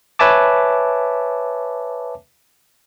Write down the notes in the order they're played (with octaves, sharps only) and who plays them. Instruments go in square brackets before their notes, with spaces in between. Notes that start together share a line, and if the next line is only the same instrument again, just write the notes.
[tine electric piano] B4 C#5 E5 G#5 A5 D6